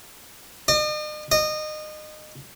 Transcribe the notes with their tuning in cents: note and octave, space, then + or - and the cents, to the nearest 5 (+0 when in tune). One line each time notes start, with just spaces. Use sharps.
D#5 -45
D#5 -25